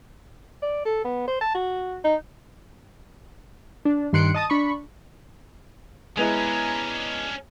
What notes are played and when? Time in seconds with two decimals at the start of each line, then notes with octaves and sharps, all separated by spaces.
0.62 D5
0.85 A4
1.04 B3
1.27 C5
1.41 A5
1.55 F#4
2.04 D#4
3.85 D4
4.13 G2 D#3 C6 F#6 C#7 D7
4.34 D#5 A5 D#6
4.50 D4 B5 C#6
6.17 G#3 B3 C#4 D4 E4 G#5 A#5